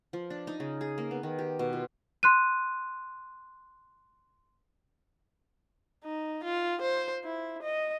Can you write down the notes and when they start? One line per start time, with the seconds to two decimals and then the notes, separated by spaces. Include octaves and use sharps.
0.13 F3
0.30 D4
0.47 D#4
0.60 C#3
0.81 G#4
0.98 A#3
1.11 B3
1.23 D#3
1.39 G4
1.59 B2
1.73 F4
2.23 C6 F#6 D#7
6.04 D#4
6.44 F4
6.82 C5
7.24 E4
7.63 D#5